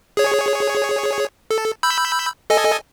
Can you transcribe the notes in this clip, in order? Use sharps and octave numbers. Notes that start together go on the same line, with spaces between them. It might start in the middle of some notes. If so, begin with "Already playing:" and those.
G#4 C#5
A4
B5 E6 G6
A4 D#5 G#5